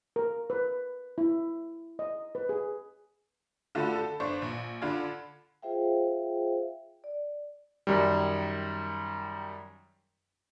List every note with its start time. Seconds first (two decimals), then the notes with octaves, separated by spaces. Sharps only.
0.16 A#4
0.50 B4
1.18 E4
1.99 D#5
2.35 B4
2.49 G#4
3.75 D3 A3 F4 F#4 A4 B5
3.96 A4
4.20 G1 D4 C5 C#6
4.42 A#1
4.81 D3 D4 F4 B5 G#6
5.62 F4 G#4 C5 E5 F5 G5
7.04 D5
7.87 F#2 D#3 G3